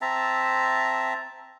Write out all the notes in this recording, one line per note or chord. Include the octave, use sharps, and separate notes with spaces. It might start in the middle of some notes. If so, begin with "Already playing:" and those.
C4 E5 A5 A#5